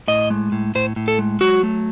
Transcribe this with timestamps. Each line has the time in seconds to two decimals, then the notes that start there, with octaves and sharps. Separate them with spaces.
0.08 A2 D#5
0.30 G#3
0.52 A2
0.75 A2 C5
0.96 A2
1.08 A4
1.19 G#3
1.41 F#3 F#4
1.63 A3